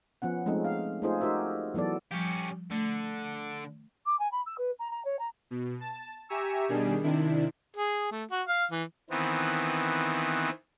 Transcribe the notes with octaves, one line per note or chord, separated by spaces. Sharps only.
F3 B3 C#4 F#5
F3 G#3 A3 C4 C#4 D#4
F5
A3 C#4 D#4 F4 G#4 C5
D#4 F#4 G4 A#4 C5 E5
E3 F#3 B3 A4 D5
F3 G3 C#4 G4
D3 A3
D6
G#5
B5
E6
B4
A#5
A#5
C#5
A#5
B2
A5
G4 E5 G#5 A#5 C#6 E6
B2 D#3 G3 D4 G#4
C3 D#3 D4 E4
G#4
A3
F#4
F5
E3
D#3 E3 B3 C4